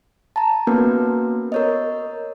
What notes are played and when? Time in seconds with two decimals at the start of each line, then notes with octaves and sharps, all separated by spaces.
0.36 A5 A#5
0.67 A#3 B3 C#4 F#4 A#4 B4
1.52 A#4 C#5 D#5